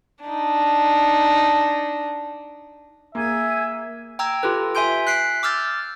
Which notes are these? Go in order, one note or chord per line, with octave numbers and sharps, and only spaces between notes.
D4 D#4
A#3 G#4 E5 G#5 G#6
G5 A#5 E6 G#6
F4 G4 A4 B4
E5 G#5 C6 G6 D7
F#6 B6 C7 D7
D6 E6 F6 G6 A6